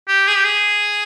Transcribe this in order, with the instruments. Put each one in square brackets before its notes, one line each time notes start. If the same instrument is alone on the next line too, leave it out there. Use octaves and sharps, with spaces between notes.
[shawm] G4
G#4
G4
G#4